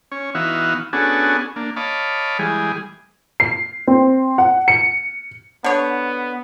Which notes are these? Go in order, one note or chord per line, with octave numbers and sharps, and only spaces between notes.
C#4 C#5
E3 B3 D#4 F#4 E5 F5
B3 C#4 D4 F#4 G#4 A4
A#3 D4
C#5 D#5 F5 A5 B5 D6
E3 G3 G#3 G#4
C7
C4
F#5
C#7
D3 B3 C#5